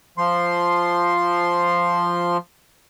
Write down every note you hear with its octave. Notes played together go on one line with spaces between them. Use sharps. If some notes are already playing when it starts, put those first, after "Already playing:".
F3 C6